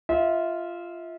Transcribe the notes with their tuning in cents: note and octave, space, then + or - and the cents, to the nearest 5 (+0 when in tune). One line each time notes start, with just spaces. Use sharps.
F4 -10 E5 -35